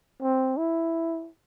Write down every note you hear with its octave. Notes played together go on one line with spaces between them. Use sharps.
C4
E4